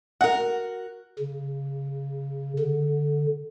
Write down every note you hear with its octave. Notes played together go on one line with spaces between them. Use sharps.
F#4 A#4 F#5
C#3
D3